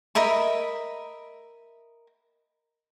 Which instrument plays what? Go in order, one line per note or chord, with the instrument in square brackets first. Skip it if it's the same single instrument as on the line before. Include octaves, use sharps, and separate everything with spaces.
[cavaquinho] A#4 D#5 E5 B5